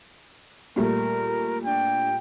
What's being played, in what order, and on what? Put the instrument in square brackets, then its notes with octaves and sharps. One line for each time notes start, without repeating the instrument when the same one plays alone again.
[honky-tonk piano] A#2 G3 A3 [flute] A#4
[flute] D4 [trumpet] G5